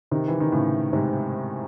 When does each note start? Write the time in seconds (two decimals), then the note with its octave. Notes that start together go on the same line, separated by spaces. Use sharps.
0.11 C3 D#3
0.28 E3
0.40 D#3
0.52 A2 C#3
0.93 G#2 C3